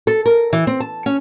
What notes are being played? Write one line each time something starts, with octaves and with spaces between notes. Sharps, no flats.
A4
A#4
E3
C4
A5
C#4